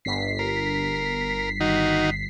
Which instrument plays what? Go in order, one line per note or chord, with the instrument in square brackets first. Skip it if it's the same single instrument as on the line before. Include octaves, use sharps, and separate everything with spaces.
[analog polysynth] G1 B6 C7
[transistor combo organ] A#4
D#3 D#4 F#4